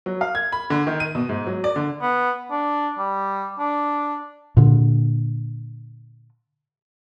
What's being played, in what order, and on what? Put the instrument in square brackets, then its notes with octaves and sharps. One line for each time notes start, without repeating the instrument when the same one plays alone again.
[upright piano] F#3
F5
G#6
B5
D3
D#3
D#7
B2
G#2
F#3
D5
D3
[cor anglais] B3
D4
G3
D4
[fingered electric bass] A#2 D3